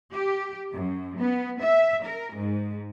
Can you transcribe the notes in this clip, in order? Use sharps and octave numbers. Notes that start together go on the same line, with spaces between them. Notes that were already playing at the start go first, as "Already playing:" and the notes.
G4
F#2
B3
E5
A#4
G#2